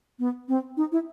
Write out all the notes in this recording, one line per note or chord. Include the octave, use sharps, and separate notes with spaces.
B3
C4
D#4
E4